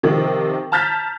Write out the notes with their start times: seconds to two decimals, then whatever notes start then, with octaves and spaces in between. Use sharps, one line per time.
0.03 C3 D#3 F3
0.72 A5 A#5 F6 G6 A6 B6